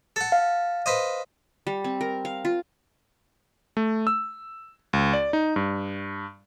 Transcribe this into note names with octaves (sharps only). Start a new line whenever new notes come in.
A4 F#5
F5
B4 C5 D#5
G3
C4
A#4
F5
F4
A3
E6
C#2
D5
D#4
G2